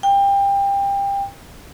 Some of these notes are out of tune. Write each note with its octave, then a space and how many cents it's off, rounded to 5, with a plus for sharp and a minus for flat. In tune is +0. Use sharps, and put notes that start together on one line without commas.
G5 +25